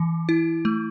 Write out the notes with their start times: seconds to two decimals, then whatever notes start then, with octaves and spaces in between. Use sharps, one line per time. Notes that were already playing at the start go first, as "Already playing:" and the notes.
Already playing: E3
0.29 E4
0.65 A3